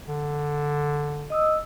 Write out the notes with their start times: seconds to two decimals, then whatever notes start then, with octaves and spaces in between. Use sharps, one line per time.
0.08 D3
1.30 D#5 D#6 E6